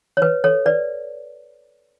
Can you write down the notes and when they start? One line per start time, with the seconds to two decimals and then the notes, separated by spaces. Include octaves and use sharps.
0.17 C#5
0.22 B4
0.44 A4 C#5
0.66 B4 D5